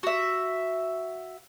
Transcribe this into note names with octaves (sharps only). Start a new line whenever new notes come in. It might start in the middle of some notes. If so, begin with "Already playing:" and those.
F#4 E5